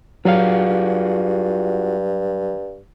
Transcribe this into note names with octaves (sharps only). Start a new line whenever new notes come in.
G2 F#3 F4 F#4 G#4 F5